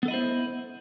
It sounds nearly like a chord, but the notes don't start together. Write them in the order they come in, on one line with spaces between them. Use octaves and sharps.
B3 A4 D#5 E4 C5